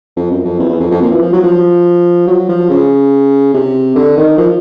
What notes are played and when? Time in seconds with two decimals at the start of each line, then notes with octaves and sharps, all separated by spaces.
0.17 F2
0.31 F#2
0.45 F2
0.59 E2
0.69 E2
0.81 F2
0.91 F2
1.02 A#2
1.11 E3
1.22 F3
1.33 F#3
1.44 F3
2.27 F#3
2.49 F3
2.70 C#3
3.54 C3
3.96 D3
4.17 D#3
4.38 F3